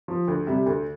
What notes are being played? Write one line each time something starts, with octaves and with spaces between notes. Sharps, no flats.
F3
D2
C3 G3
D2